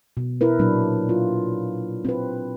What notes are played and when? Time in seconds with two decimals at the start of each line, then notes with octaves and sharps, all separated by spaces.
0.17 B2
0.41 E4 A#4 B4
0.59 A#2 F#3 D4
1.09 F4
2.05 C4 B4